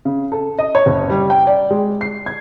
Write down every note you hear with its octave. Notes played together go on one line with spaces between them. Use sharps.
C#3
A4
D#5
C#5
F#1
G3
G5
D5
G#3
C7
G#6